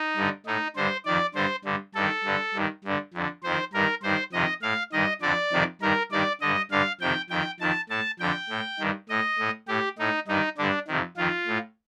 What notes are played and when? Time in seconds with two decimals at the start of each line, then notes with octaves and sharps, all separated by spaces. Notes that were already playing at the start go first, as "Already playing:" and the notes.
Already playing: D#4
0.17 G2 D3
0.46 A2 D#4
0.76 G2 D3 C5
1.05 F2 D#3 D5
1.35 G2 D3 C5
1.65 G2 D3
1.95 G2 D#3 A4
2.24 G2 D3
2.54 G2 D#3
2.84 G2 D3
3.14 F2 D3
3.43 F2 D#3 C5
3.73 G2 D#3 A#4
4.03 G2 D#3 C5
4.33 F2 C3 D#3 D#5
4.62 A2 F5
4.92 G2 D#3 D#5
5.22 F2 D3 D5
5.52 F2 C3 D#3
5.82 G2 D#3 A#4
6.12 G2 D#3 D5
6.41 G2 D3 D#5
6.71 G2 D3 F5
7.01 F2 C3 D#3 G5
7.30 F2 D#3 G5
7.60 F2 D#3 A5
7.89 A2 A5
8.20 F2 D3 G5
8.49 A2
8.79 G2 D#3
9.09 A2 D#5
9.39 A2
9.68 A2 G4
9.99 A2 D#4
10.28 G2 D#3 D#4
10.58 G2 D3 D4
10.87 F2 C3 D#3
11.17 F2 D#3 F4
11.47 A2